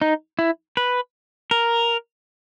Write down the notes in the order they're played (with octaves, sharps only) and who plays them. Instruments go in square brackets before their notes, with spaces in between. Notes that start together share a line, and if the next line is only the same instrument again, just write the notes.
[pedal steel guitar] D#4
E4
B4
A#4